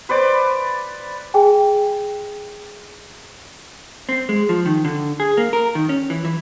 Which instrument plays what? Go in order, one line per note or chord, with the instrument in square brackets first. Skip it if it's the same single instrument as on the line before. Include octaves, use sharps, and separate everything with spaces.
[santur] B4 C5 D5 D6
[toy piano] G#4 G5 G#5
[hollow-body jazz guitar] C4
G#3
F3
D#3
D3
G#4
A#3
A#4
D#3
C#4
E3
E3